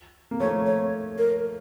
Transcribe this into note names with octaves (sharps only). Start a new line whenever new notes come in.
A#3
F3 A3 C#5
C#5
A#4